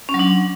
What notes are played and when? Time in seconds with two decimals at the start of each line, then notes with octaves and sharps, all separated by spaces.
0.09 C#4
0.14 F#3
0.19 D4